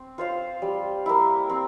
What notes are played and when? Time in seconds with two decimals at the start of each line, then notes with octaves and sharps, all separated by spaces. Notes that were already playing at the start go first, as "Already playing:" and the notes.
Already playing: C4
0.18 F4 C5 F5
0.62 G3
1.06 A#3 E4
1.50 C4